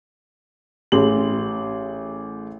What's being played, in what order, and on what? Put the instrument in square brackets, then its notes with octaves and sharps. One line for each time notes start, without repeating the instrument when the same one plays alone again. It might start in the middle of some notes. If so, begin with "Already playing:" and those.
[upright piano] A1 G#4 F#7